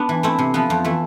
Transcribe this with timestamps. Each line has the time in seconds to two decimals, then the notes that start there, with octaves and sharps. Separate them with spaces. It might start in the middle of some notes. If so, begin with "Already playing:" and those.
Already playing: B3 D4
0.09 E3
0.23 A3 C4 E4
0.39 C3
0.54 F3 B3
0.70 F2
0.84 E3 A3